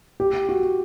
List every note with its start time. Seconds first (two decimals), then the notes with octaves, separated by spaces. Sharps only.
0.20 G4
0.49 F#4